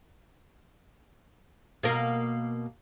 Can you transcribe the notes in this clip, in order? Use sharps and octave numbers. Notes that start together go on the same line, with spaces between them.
B2 A#3 A#4